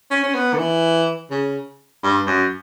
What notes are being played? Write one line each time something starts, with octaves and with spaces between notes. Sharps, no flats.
C#4
C#4
B3
D3
E3
C#3
G2
F#2